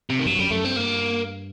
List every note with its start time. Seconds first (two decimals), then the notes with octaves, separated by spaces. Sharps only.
0.10 C3
0.19 D#3
0.26 G2 F#3
0.39 F#2 G3
0.51 F#2 A3
0.64 G2 C4
0.76 A#3